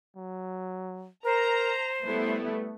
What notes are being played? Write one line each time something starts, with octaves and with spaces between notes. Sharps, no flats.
F#3
A#4 C5 A#5
G3 A3 B3 E4